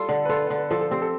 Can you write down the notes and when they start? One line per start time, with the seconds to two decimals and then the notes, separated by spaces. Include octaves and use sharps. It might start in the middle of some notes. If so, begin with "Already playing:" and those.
Already playing: G3 F4 A4
0.09 D3
0.25 B4
0.29 F4 A4
0.44 B4
0.50 D3
0.58 B4
0.71 F3 A4
0.81 A4
0.91 C4 G4
1.02 A4